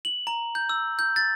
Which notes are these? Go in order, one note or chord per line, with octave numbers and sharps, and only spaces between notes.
F#7
A#5
G6
E6
G6
A6